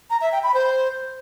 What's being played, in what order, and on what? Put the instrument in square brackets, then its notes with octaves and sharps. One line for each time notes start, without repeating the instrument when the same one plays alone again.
[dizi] A#5
E5
G5
B5
C5